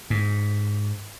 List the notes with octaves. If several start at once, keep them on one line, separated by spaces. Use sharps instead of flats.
G#2